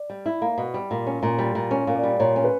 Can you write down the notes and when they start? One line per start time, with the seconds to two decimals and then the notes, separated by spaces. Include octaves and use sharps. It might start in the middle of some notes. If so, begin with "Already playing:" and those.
Already playing: D5
0.10 G3
0.26 E4
0.42 A#3
0.58 B2
0.74 G3
0.91 A#2
1.07 C#4
1.23 A#2
1.38 G3
1.55 A#2
1.71 C#4 C#5
1.87 A#2
1.95 D5
2.03 G3
2.19 A#2 C#5
2.36 C#4
2.44 B4